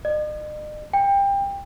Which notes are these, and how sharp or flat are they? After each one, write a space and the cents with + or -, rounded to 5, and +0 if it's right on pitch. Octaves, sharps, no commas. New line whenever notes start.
D#5 -45
G5 +25